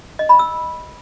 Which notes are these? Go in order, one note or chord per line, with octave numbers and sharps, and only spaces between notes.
D#5
B5
E6